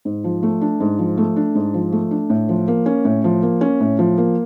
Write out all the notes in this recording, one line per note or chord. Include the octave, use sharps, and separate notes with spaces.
G#2
F3
A3
D4
G#2
F3
A3
D4
G#2
F3
A3
D4
A2
F3
A#3
C#4
A2
F3
A#3
C#4
A2
F3
A#3